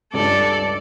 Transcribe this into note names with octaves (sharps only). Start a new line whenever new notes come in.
C#2 G2 A4 D5